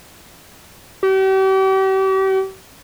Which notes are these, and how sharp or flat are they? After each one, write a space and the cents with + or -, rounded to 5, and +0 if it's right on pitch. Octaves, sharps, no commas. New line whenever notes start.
G4 -40